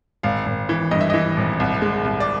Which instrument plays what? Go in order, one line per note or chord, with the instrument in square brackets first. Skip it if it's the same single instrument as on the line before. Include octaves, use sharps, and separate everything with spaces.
[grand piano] G#1 F5
G#1
E3
G2 D#5
E5
E3 D#5
G#1
C2
G#3
C2
D5